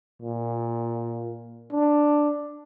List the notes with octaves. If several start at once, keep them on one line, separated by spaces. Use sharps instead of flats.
A#2
D4